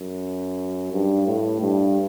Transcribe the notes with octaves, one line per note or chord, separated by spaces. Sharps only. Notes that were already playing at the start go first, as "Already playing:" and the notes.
Already playing: F#2
G2
A2
G2